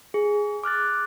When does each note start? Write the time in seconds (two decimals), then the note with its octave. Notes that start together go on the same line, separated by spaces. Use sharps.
0.14 G#4
0.64 D6 F6 F#6 A6